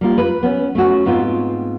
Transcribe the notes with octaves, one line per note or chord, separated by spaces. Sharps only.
G3 A#3 F4
B4
B3 C#4
A3 C#4 F#4
G#2 B3 C4 F4